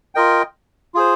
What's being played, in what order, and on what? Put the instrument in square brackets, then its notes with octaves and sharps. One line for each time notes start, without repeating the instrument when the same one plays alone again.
[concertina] F4 A#4 D#5 G5
F4 G#4 C5